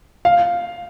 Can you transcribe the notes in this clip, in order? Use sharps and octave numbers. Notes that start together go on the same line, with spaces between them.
F5